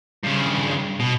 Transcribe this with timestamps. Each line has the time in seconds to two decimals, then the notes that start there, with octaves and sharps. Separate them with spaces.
0.24 G2 C#3
1.00 B2